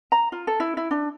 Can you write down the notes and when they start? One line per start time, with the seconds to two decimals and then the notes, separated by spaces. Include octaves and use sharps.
0.12 A#5
0.32 F4
0.47 A4
0.60 E4
0.77 E4
0.91 D4